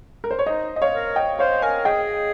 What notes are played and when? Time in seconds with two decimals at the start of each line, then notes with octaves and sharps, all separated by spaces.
0.24 A#4
0.31 C5
0.39 C#5
0.46 D#4 C5 D#5
0.76 D#5
0.82 C#5 F5
0.94 A#4
1.16 D#5 G5
1.39 C5 C#5 F5
1.62 A#4 F5 G#5
1.85 G#4 D#5 G5